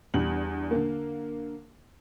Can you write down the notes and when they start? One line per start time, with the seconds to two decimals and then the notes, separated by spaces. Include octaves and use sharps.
0.14 E2 G3 D4 F#7
0.71 D3 A#3